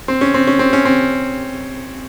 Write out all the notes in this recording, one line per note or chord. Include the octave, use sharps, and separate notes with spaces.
C4
C#4
C4
C#4
C4
C#4
C4